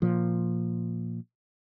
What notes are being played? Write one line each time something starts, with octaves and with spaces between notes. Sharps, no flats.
A#2 F3